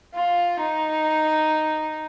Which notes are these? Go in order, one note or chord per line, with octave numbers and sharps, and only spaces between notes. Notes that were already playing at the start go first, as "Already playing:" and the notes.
F4
D#4